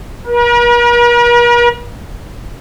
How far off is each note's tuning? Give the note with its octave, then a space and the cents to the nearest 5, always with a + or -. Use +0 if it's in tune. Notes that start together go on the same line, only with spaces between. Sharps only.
A#4 +45